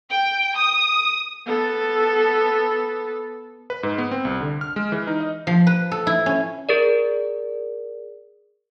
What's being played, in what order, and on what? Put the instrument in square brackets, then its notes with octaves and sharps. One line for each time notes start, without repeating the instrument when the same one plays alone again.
[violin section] G5
D#6
[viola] B3 A4
[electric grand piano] B4
G#2
B3
C4
C2
D3
F6
G#3
E3
D#4
D#5
[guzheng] F3
B4
A4
E4
C#4
[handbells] G#4 A#4 D5